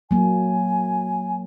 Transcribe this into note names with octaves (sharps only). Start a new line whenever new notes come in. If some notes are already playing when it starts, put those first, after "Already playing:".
F#3 A#3 G#5